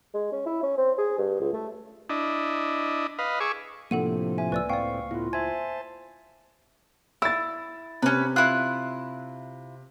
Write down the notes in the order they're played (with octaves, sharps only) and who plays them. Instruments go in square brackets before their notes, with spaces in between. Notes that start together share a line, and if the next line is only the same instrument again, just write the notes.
[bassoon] G#3
C#4
E4
C#4
C4
G#4
G2
C#2
A3
[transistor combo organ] D4 E4 D#5
B4 D#5 F5
G#4 C#6 D6 E6
[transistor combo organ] A2 C3 F3 [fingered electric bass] A#3 D4 [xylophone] A4 F#5 D#7
[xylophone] E5 [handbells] G#5
[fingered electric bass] C#2 A#3 [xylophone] B4 D5 E6
[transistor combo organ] A2 C4 [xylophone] D5 G5 [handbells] F5 C#6
[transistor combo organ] A2 B3 [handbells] E4 F4
[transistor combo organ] C5 A5 [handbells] E5 G#5 [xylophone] G#6
[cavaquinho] E4 [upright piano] E6 A6
[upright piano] C3 [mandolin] C#4 B4
[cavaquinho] E4 F4 [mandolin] F#6